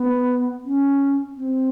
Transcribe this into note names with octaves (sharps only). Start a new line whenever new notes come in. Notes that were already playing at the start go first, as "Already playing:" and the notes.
Already playing: B3
C#4
C4